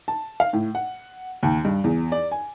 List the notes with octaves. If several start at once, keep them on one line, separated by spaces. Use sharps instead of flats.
A5
F5
A2
F#5
D#2
G2
E2
D5
G#5